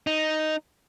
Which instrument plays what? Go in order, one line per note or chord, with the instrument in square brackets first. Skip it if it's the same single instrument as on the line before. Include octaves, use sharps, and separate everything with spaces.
[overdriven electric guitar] D#4